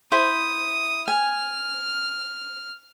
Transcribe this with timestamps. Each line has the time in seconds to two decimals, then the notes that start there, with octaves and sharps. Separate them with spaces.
0.12 E4 C5 B5 D#6
1.08 G#5 F6